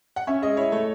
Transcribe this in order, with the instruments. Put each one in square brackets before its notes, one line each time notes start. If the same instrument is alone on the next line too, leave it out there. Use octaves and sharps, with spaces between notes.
[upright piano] F#5
[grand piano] C#4 [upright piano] E5
[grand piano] G#3 [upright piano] D#5
[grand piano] E4 [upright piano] C#5
[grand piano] A3 [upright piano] C#5